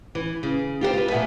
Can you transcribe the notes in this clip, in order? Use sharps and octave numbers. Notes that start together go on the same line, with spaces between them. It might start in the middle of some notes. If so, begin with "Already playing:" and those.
E3
C#3
F4 G4 G#4 C5
F4 B4
A#2 A3 B3 E5 G#5